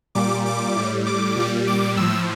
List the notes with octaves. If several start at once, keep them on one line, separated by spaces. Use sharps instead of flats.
A#2 G3 D6
D6
A2 G3
D6
A#2 G3
D6
A2 F3 E6